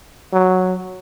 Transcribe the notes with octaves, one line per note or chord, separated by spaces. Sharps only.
F#3